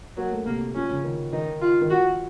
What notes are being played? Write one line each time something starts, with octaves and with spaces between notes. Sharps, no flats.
F#3 A#3
A3
C3 A#3
F3 C#4
C#3
D#3
D#3 D#4
F4
D#3
F3 F#4